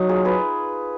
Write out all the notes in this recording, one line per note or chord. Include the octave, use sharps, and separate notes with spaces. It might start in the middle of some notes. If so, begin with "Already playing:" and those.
Already playing: F#3 D#4
F4 G#4
G#4 B4